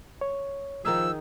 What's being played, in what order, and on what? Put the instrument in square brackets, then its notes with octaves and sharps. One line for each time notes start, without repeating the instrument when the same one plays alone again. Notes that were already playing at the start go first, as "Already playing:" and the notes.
[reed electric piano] C#5
[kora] D#3 D#4 G#4 [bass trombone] F3 [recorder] E6